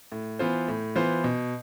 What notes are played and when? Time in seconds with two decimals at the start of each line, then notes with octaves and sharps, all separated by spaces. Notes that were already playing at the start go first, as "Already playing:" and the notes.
0.12 A2
0.39 E3 B3 F4 C5
0.68 A2
0.95 E3 B3 F4 C5
1.24 B2